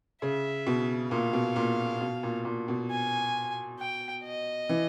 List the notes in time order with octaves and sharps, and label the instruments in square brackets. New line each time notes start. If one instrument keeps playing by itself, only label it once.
[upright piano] C#3 [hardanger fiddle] E5
[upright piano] B2
[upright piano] A#2 [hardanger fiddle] F5
[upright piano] B2
A#2
B2
A#2
A#2
B2
[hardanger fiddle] G#5
G5
D#5
[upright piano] E3